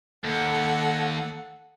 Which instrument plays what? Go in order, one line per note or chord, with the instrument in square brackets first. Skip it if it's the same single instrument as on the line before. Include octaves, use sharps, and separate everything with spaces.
[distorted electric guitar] D#2 [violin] A4 F#5